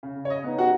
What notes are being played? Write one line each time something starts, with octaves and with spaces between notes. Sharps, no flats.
C#3
C#5
D#5
B3 D#4
F#4 F#5